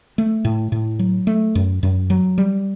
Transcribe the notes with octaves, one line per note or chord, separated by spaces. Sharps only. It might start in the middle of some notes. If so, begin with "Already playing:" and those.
A3
A2
A2
F#3
A3
F#2
F#2
F#3
G3